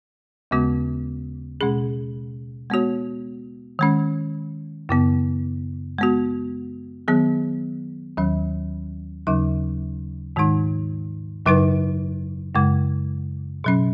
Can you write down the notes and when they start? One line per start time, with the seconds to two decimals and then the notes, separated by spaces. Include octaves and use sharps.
0.51 D#2 C#3 G#3 B3 F#4
1.61 B2 G#3 C#4 G#4
2.70 G#3 B3 F#4 C#5
3.79 D#3 G#3 C#4
4.89 F#2 C#3 B3
5.98 G#3 B3 F#4
7.08 D#3 F#3 B3 G#4
8.17 D#2 D#3 F#3 C#4
9.27 D#2 C#3 F#3 D#4
10.36 G#2 D#3 G#3 D#4
11.46 F#2 C#3 F#3 D#4 B4
12.55 F#2 C#3 G#3
13.64 B2 F#3 C#4